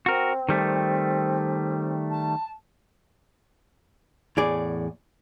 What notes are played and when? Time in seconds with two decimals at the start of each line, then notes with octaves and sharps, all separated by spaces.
0.06 C4 F#4 A#4
0.49 D#3 G3 A3
2.11 A5
4.37 E2 A2 G#4 D5